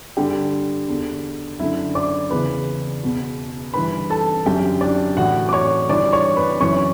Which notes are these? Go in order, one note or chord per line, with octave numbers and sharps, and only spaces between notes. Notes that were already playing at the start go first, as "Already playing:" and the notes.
G2 D3 G4
E2 D3
F#2 D3 E4 E5
D5 D6
E2 C#3 E3 B4 B5
E2 B2
G2 E3 B4 B5
A4 A5
F#2 D3 G4 G5
D4 D5
A2 E3 F#4 F#5
D6
C#5 C#6
G2 E3 D5 D6
C#5 C#6
B4 B5
F#2 E3 C#5 C#6